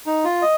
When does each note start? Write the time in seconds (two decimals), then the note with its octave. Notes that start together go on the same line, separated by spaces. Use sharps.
0.06 D#4
0.25 F4
0.42 D#5